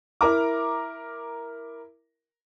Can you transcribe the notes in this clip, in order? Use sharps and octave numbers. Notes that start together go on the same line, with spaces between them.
E4 A#4 A#5 D6